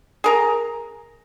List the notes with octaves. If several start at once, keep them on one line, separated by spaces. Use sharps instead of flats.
G#4 A#4 A#5